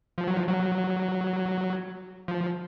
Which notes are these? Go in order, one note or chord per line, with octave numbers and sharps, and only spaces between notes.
F3
F#3
F3
F#3
F3